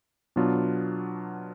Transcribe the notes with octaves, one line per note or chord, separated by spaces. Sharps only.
B2 F#3 B3 D4 F4